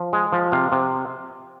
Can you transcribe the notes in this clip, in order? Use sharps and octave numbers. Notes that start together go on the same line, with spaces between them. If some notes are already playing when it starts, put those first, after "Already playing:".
Already playing: F3
G#3
F3
C3 F5
C3